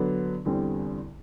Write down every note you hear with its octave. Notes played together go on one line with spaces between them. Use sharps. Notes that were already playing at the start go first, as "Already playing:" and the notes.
Already playing: D3 F#3 B3 D4
E2 D3 G3 C4